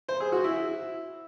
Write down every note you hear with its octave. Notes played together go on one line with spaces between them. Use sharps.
C5
G#4
F#4
E4